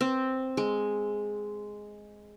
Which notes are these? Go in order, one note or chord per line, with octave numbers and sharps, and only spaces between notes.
C4
G#3